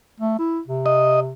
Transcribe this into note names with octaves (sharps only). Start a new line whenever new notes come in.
A3
E4
C3
D#5